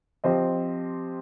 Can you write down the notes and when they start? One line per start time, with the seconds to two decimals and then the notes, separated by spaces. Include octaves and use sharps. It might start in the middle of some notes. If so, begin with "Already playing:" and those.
0.24 F3 C4 G4 C5 D#5